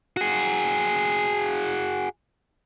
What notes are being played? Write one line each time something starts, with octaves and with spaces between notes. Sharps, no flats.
F#4 G#4